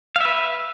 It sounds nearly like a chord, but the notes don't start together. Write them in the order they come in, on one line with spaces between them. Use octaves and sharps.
F5 E5 B4